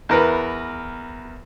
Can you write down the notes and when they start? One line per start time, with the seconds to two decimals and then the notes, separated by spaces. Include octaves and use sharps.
0.09 E2 A#4 B4